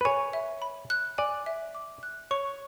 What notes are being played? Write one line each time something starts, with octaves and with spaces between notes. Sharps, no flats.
B4
C#5 G#5
E5
B5
F#6
D5 G#5
E5
D6
F#6
C#5 C#6